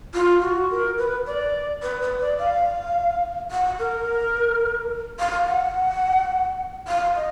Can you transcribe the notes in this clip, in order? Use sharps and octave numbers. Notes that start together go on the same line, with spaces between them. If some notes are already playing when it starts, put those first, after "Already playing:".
F4
F#4
A#4
B4
D5
B4
B4
D5
F5
F#5
A#4
F5
F#5
F5
D#5